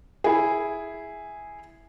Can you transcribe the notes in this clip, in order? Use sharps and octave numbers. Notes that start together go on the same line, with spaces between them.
E4 G#4